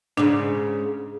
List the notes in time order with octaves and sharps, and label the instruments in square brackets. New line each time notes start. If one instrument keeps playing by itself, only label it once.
[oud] G#2 C#3 [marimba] D4